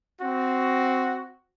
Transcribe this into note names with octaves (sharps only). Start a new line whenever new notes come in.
C4 F#4